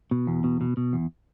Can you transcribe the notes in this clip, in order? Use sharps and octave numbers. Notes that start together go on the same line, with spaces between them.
B2
E2
B2
B2
B2
E2